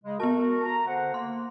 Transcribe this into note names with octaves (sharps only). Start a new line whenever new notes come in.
C#3 G#3
B3 F#4 A#4 A5
A#5
D3 C5 F#5
A#3 C6